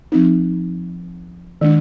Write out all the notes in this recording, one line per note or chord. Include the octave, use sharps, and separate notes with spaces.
F3 C4 D#4
D#3 G#3 D4